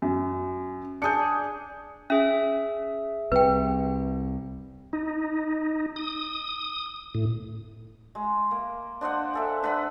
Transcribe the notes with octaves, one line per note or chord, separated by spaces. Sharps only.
F#2
D4 G#4 D5 G6 C#7
C#4 G#4 E5
C2 C3 B4 G5
D#4
D#6
A2
G#3
A#3
D4 C5 D#5 F#5
G#4 A4 E5
D4 B4 F#5 A#5